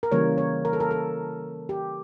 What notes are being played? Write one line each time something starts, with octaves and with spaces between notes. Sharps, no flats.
A#4
C#3 E3 G3 A#3 C#5
C#5
A#4
A4
A#4
A4
G4